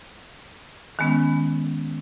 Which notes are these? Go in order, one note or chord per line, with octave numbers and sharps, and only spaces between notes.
D#3 G#3 B3 C#4